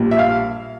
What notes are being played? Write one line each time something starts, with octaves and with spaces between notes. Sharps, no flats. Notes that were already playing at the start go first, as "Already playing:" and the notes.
Already playing: A#1 A#2 G3
E5
F5